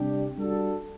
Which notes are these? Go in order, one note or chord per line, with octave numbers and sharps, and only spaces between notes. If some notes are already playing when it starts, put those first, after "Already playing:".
Already playing: C3 G3 D4 G4
G3 D4 F#4 A4